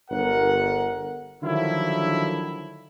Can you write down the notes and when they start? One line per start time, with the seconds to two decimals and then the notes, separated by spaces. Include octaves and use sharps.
0.11 G1 A#4 F#5
1.43 D3 D#3 F3 F#3 E4